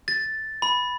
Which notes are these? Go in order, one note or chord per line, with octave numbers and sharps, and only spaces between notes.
A6
B5